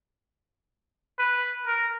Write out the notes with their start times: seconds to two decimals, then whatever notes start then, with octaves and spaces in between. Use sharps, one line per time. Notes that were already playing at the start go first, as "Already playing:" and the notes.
1.19 B4
1.67 A#4